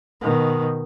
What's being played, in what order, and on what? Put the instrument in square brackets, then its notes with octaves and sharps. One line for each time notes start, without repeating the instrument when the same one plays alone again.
[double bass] B2 D#3